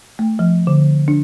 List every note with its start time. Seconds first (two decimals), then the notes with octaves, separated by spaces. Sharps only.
0.19 A3
0.39 F3
0.67 D3
1.08 D4